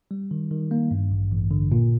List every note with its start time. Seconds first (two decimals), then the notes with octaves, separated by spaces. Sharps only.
0.11 G3
0.31 D#3
0.51 D#3
0.71 A#3
0.91 G2
1.11 A1
1.31 A1
1.51 D3
1.72 A#2